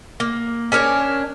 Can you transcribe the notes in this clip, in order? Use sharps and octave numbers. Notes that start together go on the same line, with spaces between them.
A#3
C#4 D4 A#4 C#5